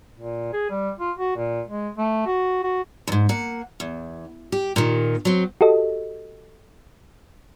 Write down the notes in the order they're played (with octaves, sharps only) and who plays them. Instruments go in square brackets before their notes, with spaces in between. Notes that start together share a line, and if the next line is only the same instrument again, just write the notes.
[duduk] A#2
G#4
G3
F4
F#4
A#2
G#3
A3
F#4
F#4
[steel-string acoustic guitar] D#2 G#2
A#3 F#5
E2
G4
A#2 D#3
F#3 C4
[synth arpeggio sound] F#4 G4 A4 D#5